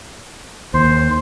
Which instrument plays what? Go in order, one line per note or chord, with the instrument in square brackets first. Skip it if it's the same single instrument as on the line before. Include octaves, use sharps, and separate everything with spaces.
[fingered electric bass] D#2 [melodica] C5